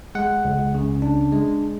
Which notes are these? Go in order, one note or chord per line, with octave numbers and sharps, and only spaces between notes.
G#3 F#5
C#2
C#3
D4
G#3